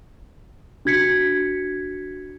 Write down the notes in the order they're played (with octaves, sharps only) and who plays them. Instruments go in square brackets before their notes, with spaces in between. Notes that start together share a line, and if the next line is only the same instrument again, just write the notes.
[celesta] D4 F#4 G#6 B6 C#7